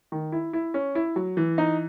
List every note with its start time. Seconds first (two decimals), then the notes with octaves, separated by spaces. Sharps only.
0.12 D#3
0.32 E4
0.53 E4
0.74 C#4
0.95 E4
1.16 F#3
1.37 E3
1.58 D#4